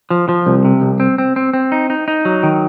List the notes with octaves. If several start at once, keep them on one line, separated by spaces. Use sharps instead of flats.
F3
F3
C2
C3
C2
C4
C4
C4
C4
D#4
D#4
D#4
F#3
D#3